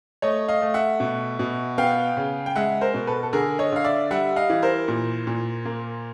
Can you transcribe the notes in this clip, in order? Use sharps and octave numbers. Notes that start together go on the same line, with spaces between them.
A3 C#5 D#5
D#5 F5
A3
E5 F#5
B2
B2
B3 F5 G5
C#3
G5
G#3 E5 F#5
A#4 C5
B2
A4 B4
A4
D3 G#4 A#4
C#5 D#5
D3 F5
D5 E5
G3 E5 F#5
D#5 F5
E3
A#4 C5
A#2
A#2
A#3